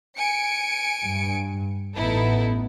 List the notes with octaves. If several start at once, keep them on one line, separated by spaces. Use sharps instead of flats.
G#5 C#7 D7
G2
A1 B3 D#4 E4 A4